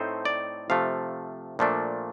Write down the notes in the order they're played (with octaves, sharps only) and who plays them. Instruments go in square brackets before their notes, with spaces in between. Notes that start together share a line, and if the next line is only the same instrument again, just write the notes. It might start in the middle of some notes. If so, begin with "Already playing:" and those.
Already playing: [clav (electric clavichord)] A2 A3 C4 D#4 C5
D5
C3 F3 A3 F5
A#2 F3 A3 D4